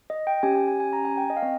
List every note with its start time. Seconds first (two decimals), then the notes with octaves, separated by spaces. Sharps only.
0.10 D#5
0.27 G5
0.43 C#4 G4 G#5
0.55 G#5
0.68 G#5
0.80 G#5
0.93 A#5
1.05 G#5
1.17 G5
1.30 D#5
1.37 F5
1.42 C4 D#5